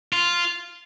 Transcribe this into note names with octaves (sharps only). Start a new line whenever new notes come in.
F4